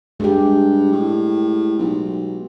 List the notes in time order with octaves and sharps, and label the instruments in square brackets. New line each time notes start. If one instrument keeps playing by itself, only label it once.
[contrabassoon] G2 [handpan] G#3 G4
[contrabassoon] A2
B1